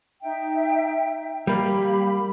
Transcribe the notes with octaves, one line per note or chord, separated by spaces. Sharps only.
D#4 E5 G5
G3 A#3 G4 F5 B5